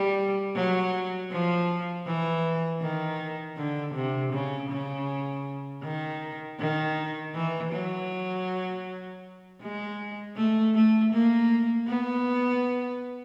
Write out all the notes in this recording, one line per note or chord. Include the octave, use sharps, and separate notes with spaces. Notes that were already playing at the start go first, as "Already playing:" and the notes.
Already playing: G3
F#3
F3
E3
D#3
D3
C3
C#3
C#3
D#3
D#3
E3
F#3
G#3
A3
A3
A#3
B3